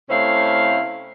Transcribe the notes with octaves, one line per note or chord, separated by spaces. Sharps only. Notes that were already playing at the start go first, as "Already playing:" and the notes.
C3 A3 C#4 E4 C5 F5